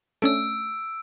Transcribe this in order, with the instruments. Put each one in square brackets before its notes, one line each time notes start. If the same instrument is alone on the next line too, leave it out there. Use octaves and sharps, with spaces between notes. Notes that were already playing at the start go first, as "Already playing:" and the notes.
[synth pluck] A3 C#4 D4 [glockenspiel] E6 D7